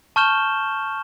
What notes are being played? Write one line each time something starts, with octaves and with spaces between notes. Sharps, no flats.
A5 C#6 F6 G6 E7 G7